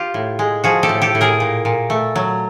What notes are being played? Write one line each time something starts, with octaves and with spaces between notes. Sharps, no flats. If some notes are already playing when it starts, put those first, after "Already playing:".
Already playing: F4 G4
A2
G#3
F3 F#4 G#4
G4 A4
A2
G4 A4
A2
G#4 A#4
A#2
A#2
A3
F#3